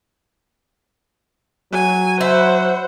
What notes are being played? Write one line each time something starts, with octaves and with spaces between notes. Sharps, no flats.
F#3 G#5
E4 C5 F#5